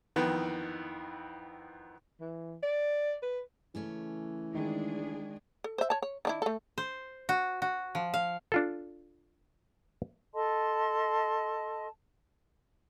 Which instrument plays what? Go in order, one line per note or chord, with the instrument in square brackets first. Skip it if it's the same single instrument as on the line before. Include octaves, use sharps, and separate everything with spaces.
[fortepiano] F2 D#3 E3 B3
[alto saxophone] E3
D5
B4
[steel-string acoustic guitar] C#3 A3 C#4 [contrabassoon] E3
[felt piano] D#3 [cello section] G#3 D4 G#4
[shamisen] A4
C5 E5
C#5 A5
C#5
D#3 D4 E4
A3 A4
[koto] C5
F#4
F#4
F3
F5
[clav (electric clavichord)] D4 F4 A4
[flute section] A4 D#5 A5 C6